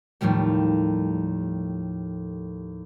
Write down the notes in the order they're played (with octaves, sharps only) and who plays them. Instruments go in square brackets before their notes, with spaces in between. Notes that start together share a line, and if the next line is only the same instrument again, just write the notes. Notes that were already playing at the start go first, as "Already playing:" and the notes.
[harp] D#2 A2 F3 G3 A3